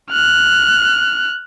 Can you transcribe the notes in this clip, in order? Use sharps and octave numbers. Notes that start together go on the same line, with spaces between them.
F6 F#6